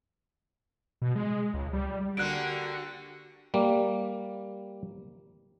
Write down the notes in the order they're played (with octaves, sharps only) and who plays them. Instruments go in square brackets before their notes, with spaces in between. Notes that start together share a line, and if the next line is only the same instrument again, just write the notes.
[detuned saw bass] B2
G#3
C#2
G3
[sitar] D3 A#3 [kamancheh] F#4 G4 [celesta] F#6 D7
[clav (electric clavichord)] G3 A#3